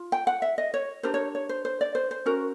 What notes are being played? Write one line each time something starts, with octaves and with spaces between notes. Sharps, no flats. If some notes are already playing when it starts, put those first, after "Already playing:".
Already playing: F4
G5
F#5
E5
D#5
C#5
D4 G4 A#4 C5
C#5
C#5
C5
C5
D5
C5
C5
C#4 F#4 A#4